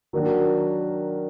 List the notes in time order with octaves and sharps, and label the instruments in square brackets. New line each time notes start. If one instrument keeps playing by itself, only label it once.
[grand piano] D#3 F#3 A#3 D4 F#4